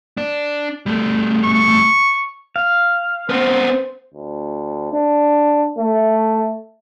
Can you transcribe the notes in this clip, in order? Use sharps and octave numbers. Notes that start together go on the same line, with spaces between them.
D4 D5
G3 A3
C#6
F5
B3 C4 C5
D2
D4
A3